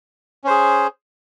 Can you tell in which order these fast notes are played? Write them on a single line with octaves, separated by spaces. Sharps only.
C#4 C5 G#4